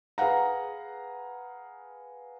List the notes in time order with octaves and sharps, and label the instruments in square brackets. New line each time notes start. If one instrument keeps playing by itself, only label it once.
[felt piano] G#4 B4 F5 F#5 A#5